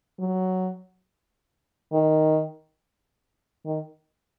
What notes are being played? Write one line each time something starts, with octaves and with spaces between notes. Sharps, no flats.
F#3
D#3
D#3